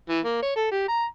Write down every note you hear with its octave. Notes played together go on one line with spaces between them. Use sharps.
E3
A#3
C#5
A4
G4
A#5